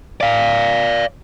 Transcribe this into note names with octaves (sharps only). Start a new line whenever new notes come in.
D5 F5